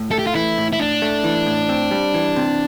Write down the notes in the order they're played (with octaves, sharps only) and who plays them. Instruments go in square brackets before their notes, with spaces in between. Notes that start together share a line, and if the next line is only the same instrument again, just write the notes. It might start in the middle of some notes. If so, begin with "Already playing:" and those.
Already playing: [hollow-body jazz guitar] A2
[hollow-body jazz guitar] A3 [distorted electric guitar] A4
[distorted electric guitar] G4
F4
[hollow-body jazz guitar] E3 [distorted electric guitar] E4
[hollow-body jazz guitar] A2
[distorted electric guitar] E4
[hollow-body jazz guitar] A2 [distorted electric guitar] D4
[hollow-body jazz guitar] A3
E3
A2
C4
G3
E3
C3